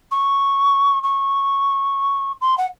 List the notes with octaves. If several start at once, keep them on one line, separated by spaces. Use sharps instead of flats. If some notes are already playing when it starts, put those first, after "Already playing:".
C#6
C#6
C6
F#5